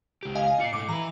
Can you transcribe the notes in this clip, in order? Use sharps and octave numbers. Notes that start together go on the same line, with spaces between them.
C#2 G4
D#5 F5 G#5
F4 D5 C7 C#7
G#2 A3 D6
E3 B4 A#5